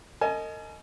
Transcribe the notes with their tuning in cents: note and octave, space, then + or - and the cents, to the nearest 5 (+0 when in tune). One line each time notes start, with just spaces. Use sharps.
A#4 -45 D#5 +0 G#5 +30